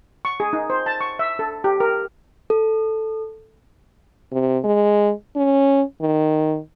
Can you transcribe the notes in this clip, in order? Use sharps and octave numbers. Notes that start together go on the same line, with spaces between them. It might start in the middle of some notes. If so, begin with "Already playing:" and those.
C#6
G#4
D#4
C5
A5
C#6
E5
A4
G4
A#4
A4
C3
G#3
C#4
D#3